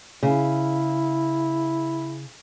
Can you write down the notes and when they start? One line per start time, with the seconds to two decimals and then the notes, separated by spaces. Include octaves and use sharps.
0.23 C#3 E4